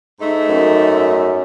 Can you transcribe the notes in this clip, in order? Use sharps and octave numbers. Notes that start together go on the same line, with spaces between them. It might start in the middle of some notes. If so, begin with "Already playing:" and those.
G#2 A3 D#4
F#2